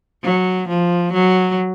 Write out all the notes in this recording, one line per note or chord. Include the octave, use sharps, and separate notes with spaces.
F#3
F3
F#3